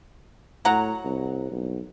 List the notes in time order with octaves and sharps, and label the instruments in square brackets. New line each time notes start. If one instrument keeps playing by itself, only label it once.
[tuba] A2 [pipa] F#3 F#5 A#5
[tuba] C2
B1